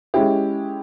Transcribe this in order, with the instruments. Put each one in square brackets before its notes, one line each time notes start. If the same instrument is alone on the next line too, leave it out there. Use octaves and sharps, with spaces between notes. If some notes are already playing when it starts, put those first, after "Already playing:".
[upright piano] G#3 C#4 E4 G4